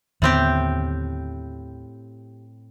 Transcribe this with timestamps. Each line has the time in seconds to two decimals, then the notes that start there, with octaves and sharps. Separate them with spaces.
0.22 D#2 A2 D3 B3 C4 G4